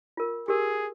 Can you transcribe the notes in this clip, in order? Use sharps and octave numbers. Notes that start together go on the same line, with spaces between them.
F4 A#4
G4 G#4 A#4